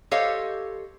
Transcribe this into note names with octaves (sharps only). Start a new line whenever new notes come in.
G4 A4 C5 C#5 D#5 F5